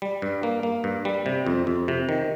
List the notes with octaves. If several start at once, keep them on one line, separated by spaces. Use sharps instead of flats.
G3
G2
A#3
A#3
G2
G3
C3
F2
F2
C3
D#3